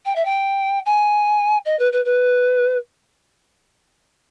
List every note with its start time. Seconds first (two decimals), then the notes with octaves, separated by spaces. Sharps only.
0.05 G5
0.15 E5
0.25 G5
0.86 G#5
1.65 D#5
1.79 B4
1.92 B4
2.05 B4